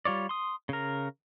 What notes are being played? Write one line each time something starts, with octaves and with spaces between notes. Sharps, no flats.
G3 F4 C#5 D5
C6 D#6
C#3 A#4